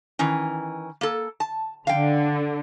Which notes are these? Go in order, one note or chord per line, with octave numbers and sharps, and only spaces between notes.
D#3 E3 C#4
A#3 A4
A5
D3 F5 G5